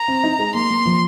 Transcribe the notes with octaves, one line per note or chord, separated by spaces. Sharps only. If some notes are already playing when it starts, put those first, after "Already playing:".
Already playing: A#5
C4
D#4
G#3
A#3 C6
A#3
F3